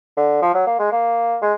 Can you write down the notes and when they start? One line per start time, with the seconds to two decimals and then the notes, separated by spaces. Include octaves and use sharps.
0.17 D3
0.42 F3
0.54 F#3
0.67 A#3
0.79 G#3
0.92 A#3
1.42 G#3